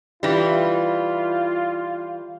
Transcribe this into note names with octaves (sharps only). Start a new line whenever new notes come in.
E3 G3 F4